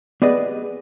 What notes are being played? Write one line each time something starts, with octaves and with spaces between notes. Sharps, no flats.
B3 G4 G#4 B4 D5 D#5